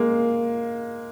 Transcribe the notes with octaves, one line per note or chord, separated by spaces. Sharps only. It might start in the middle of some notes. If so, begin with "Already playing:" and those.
Already playing: G#3 A#3